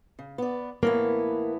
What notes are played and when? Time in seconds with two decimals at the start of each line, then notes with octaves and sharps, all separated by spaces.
0.19 C#3
0.38 B3 D5
0.83 A2 E3 A#3 B3